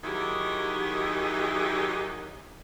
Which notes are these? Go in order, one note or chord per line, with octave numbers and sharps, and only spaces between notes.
D#3 F#3 D#4 E4 G4 G#4